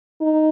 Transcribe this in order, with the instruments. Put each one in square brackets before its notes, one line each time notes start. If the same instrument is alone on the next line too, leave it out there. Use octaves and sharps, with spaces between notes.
[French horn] D#4